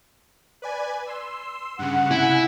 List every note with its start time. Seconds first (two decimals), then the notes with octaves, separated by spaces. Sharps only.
0.62 B4 D5 G#5
1.07 C6 E6
1.79 G2 C#3 F#5
2.11 C3 E4 G#5